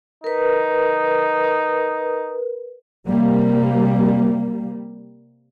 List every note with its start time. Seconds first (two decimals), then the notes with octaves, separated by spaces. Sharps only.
0.24 D#4 A#4 B4
3.06 C3 G3 A#3